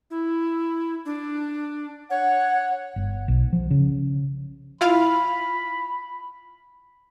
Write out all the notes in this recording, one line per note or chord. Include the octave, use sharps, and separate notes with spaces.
E4
D4
C#5 F#5
G1
B1
F3
C#3
E4 F4 F5 B5